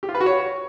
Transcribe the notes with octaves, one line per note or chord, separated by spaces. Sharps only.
G4
F4
B4
F#4
C#5